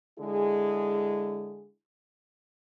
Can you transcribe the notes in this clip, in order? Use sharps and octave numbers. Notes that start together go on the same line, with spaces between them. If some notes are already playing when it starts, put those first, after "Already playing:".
D3 G#3 E4 G#4